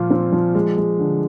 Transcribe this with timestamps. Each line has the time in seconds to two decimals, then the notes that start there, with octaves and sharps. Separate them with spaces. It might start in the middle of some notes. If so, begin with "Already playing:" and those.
Already playing: A#2 F3 F4
0.10 C4
0.32 F3
0.55 G#3
0.77 G#3
0.99 D3